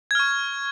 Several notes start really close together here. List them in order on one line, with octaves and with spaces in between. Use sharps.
G#6 F6 C#6